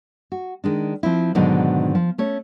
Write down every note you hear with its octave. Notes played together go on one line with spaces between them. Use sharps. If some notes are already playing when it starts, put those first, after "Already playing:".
F#4
D#3 G#3 D4
F3 C4 E4
G#2 B2 D3 D#3 F#3
F3
A3 C#4 C#5